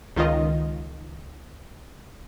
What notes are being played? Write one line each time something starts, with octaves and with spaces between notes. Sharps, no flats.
C#2 D#3 F4 D#5